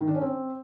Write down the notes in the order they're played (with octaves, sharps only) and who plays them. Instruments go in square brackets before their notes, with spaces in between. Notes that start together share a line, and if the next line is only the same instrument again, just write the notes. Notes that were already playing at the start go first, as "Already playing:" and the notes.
[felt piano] D#3
D4
C#4
C4